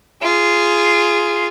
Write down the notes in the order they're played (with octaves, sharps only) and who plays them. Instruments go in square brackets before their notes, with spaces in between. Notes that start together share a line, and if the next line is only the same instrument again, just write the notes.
[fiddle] F4 G#4